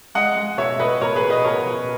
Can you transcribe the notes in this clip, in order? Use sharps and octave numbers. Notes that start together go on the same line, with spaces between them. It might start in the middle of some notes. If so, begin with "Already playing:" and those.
G#3 D#5 F#5
G#3
B2 C#5 E5
B2 B4 D#5
B2 A#4 C#5
G#4 B4
B2
B4 D#5
B2 A#4 C#5
B2